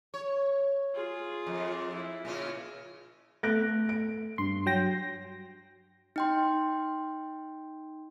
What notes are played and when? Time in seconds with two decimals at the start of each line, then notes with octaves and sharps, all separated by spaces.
0.14 C#5
0.95 F4 G#4
1.47 F2
1.93 E4
2.25 A#2 C#3 F4
3.43 A3 F#6 A#6 D7
3.89 D7
4.38 G2 C6
4.66 F#3 G5 A#6
6.16 D#4 G5 C6